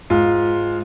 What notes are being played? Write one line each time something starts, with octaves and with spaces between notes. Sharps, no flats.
G#2 F4